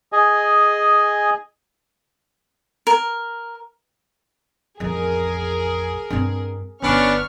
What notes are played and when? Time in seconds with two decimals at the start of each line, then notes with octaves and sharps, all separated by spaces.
0.12 G#4 D#5 G#5
2.87 A#4
4.80 A1 F2 G#4 A#4
6.10 G2 C4
6.82 G1 B3 C#4 D4 C#6 F6